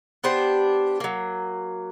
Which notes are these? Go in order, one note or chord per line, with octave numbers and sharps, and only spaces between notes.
B3 D4 G4 C5
F#3 A#3